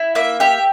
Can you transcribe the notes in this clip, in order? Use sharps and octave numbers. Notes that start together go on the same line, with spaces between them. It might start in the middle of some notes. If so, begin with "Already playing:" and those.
Already playing: E4
A#3 E5
G4 E5